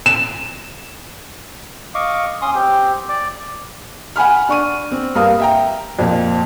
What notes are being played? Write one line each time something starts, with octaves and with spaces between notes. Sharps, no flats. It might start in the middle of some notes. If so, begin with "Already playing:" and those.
E7
D#5 F5 C#6 D6
C#4 C6 D#6
C4 G4
D5 D6
F#5 G#5 B5 F6
D4 C#6 D#7
C4
G2 A#3 A#4 F5 D#6
E5 G5 A#5
F2 A#2